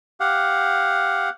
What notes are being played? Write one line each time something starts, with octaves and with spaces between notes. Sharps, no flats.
G4 F5 F#5